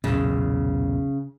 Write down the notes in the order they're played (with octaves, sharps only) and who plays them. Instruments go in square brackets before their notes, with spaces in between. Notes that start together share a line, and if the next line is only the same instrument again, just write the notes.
[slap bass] B1 E2 A#2 [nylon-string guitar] C#3